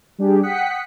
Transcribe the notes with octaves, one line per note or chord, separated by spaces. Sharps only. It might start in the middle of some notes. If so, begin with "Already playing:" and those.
G3 D4 G4 G#4
F#5 G5 D#6 F#6 B6 C#7